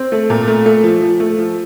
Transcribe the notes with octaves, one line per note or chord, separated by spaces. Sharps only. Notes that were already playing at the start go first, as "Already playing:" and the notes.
Already playing: C4
A3
A#2
A3
A3
F3
F3
A3
F3